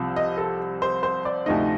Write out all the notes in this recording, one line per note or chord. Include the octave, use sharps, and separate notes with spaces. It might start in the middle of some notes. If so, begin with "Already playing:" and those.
Already playing: C2 C3 F3 C4
D#5
A4
C5
C5
D5
D2 C3 F3 A3 D#4 D#5